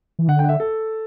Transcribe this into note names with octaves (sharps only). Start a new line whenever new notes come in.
E3
D3 F#5
G5
F#5
E5
A4